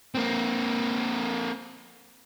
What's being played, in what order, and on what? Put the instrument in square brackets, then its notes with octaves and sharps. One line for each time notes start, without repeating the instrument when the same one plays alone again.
[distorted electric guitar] A#3 C4